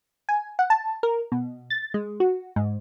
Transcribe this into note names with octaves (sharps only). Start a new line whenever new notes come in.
G#5
F#5
A5
A#4
B2
A6
G#3
F#4
G#2